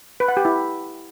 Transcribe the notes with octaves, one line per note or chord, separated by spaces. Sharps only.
B4
F#5
G4
E4